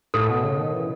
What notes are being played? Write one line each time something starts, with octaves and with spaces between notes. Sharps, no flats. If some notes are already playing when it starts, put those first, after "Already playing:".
A2 A4
B2
C#3
D#3
E3